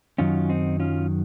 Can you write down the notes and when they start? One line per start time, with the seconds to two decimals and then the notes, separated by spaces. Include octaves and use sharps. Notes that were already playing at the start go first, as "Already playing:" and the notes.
0.18 F#2 D#3 F#3 C#4 F4
0.49 C4 D#4
0.80 C#4 F4